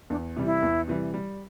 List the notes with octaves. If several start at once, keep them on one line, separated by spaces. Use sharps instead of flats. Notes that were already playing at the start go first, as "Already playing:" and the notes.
E2 D4
C3 E3 G3
E4
E2
C3 E3 G3
G3